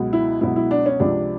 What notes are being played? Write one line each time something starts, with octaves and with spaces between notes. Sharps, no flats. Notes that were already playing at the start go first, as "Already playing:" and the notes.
Already playing: C#2 B2 F#3
E4
C#2 B2 F#3 E4
E4
D4
C#4
C#2 C3 F3 D4